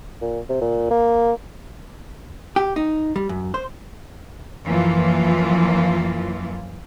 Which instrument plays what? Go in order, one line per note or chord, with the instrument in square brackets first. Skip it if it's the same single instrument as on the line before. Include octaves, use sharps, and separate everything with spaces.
[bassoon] A#2
C3
A#2
A#3
[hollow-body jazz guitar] G4
D#4
G3
F#2
C5
[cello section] F#2 E3 F3 A#3 F4